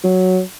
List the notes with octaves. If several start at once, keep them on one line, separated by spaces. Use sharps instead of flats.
F#3